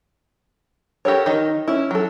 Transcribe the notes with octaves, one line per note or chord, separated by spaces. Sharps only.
F#4 G4 A4 A#4 C#5
D#3 D#5
C#4 E4
F#3 A4